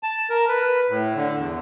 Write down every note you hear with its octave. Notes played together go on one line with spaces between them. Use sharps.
A5
A#4
B4
A2
D3
E2